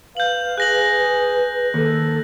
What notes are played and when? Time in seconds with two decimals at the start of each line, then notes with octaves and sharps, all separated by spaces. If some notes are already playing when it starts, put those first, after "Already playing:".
0.17 B4 F5 G6 F#7
0.58 G#4 F#6 A#6 F#7
1.74 D#2 A4